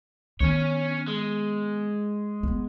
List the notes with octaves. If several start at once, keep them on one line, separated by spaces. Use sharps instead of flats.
D#3 B3 C#4 C#5
G#3
B3 C4